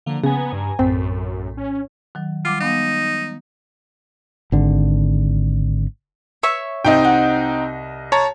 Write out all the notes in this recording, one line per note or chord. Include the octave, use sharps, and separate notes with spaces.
D3 F3 A#3
C#3 B3 G#5 A#5
G2
A#1 F#2 A2 C4
C#4
D#3 F#3
G3 F4 F#5 D6
G#3 B3 D#4 F5
G#1 D3
C#5 E5 C#6
C2 C4 D#4 D#5 G5
F#5
C#5 A5 A#5